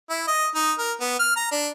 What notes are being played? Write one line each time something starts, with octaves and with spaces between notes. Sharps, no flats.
E4
D#5
D#4
A#4
B3
F6
A#5
D4